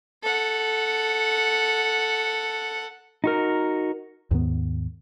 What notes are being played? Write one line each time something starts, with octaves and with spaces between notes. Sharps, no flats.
A4 F#5
D#4 F#4 A#4
D#2 G#2 D#3 B3